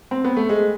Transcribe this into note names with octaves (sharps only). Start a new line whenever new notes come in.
C4
B3
A3
G#3